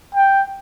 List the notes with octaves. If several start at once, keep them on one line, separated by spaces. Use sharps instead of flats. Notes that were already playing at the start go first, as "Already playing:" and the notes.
G5